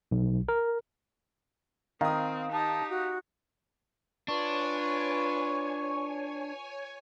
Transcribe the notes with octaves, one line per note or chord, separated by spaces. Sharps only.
B1
A#4
D#3 C4 F5 D#6
D#4 G4 A5
F#4
D4 F4 B4 C#5 G#5 C#6